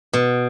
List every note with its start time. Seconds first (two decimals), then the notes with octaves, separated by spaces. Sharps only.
0.13 B2